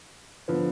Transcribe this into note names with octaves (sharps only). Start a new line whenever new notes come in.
D3 F3 B3